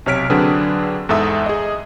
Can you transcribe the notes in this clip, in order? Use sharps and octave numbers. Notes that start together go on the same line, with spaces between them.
B1 C3 C#5 F6 B6 D7
D3 F#3 C4 D4 G#4 B4
E2 G#2 A4 E5 D#6
G#4 D#5